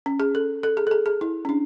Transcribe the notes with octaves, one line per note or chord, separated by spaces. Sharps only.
C#4
G#4
A4
A4
G#4
A4
G#4
G#4
E4
C#4
D4